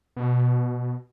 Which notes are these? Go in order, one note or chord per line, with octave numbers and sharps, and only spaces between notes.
B2